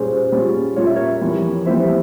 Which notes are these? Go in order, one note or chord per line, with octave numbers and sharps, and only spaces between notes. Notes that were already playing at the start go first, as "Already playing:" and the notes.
Already playing: A#2 G3 C#4 F4 G#4 C5
A#2 G3 C#4 F4
A#2 G3 C#4 F4 C#5
E5
A#4 C#5
F2 E3 G3
F2 E3 G3 C5 E5